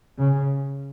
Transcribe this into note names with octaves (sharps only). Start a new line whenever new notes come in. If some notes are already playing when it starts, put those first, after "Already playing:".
C#3